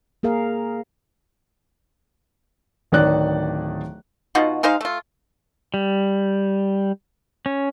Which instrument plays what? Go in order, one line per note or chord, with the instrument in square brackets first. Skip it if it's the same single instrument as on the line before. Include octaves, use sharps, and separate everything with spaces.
[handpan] A#3 G#4 A#4 F5
[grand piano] D1 D#3 C#5 D5 F#6
[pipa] B2 D#4 F4 F#4
G#3 D#4 C5 F5
A3 F4
[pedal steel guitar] G3
C#4